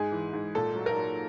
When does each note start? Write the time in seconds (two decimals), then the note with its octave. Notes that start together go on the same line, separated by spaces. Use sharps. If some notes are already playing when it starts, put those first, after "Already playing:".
Already playing: G#2 G#4
0.12 E3
0.33 G#2
0.55 A#2 A4
0.75 F#3
0.86 A#4
0.97 F#3